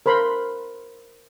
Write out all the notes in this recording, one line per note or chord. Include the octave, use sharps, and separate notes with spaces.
A#4 C5 B5 C6